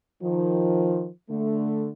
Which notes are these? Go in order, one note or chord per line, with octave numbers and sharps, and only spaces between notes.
D#3 F3
D3 A3